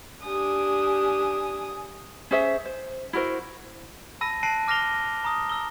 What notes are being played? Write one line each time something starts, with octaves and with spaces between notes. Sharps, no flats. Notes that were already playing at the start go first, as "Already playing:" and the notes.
D4 G4 G#5 D#6
C#4 G#4 C5 E5
C5
E4 F#4 A#4 C5
A5 B5 E6 A#6 D#7
A5 F#6 C7 D7 D#7
D6 F6 A#6 C7 F7 G7
A#5 D#6
E6 G7